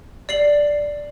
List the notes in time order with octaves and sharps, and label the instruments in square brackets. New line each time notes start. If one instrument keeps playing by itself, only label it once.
[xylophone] D5 C7 F#7